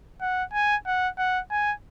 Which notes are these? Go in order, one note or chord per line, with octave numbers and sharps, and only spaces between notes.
F#5
G#5
F#5
F#5
G#5